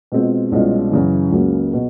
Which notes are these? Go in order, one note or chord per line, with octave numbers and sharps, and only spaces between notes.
B2 G#3 C4 F4
C2 B2 G#3 C#4 F4
F#2 C#3 E3
C#2 C#3 F#3 A#3
B2